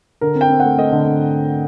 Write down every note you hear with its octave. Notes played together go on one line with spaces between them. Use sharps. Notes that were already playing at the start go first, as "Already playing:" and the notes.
D3 A#4
C4
G5
C4
A3 F#5
A3 D#5
D3
D3